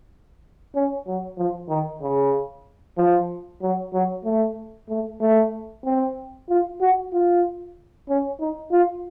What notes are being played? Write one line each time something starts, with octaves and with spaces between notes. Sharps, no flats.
C#4
F#3
F3
D#3
C#3
F3
F#3
F#3
A3
A3
A3
C4
F4
F#4
F4
C#4
D#4
F4